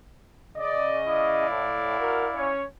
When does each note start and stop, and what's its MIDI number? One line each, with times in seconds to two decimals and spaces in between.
0.57 1.47 49
0.57 0.99 74
0.57 1.47 75
1.06 2.51 64
1.06 2.51 74
1.06 2.51 77
1.48 1.99 45
1.99 2.26 66
1.99 2.26 70
2.35 2.64 61
2.35 2.64 73